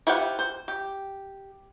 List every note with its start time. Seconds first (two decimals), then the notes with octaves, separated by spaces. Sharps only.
0.07 E4 F4 G4 C5 F#5
0.39 C5
0.68 G4